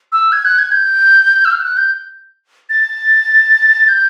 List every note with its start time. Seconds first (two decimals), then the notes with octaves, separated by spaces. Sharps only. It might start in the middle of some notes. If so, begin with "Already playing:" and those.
0.12 E6
0.32 G#6
0.45 F#6
0.58 G#6
0.72 G6
1.45 E6
1.51 F6
1.60 G6
1.64 F#6
1.77 G6
2.69 A6
3.88 G6